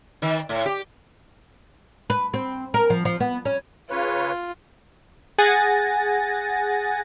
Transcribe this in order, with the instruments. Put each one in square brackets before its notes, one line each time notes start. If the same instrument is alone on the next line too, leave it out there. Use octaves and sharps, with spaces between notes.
[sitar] D#3
A2
G4
[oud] B4
C4
A#4
F3
F3
B3
C#4
[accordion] C#3 B4 C#5 [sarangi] F4
[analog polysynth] G#4 F#5 G#5 A6 A#6